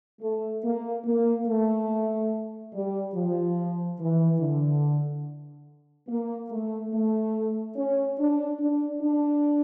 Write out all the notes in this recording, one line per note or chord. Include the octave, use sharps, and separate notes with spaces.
A3
A#3
A#3
A3
G3
F3
E3
D3
A#3
A3
A3
C#4
D4
D4
D4